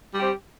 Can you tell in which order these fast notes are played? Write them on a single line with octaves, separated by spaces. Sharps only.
G3 G4 C4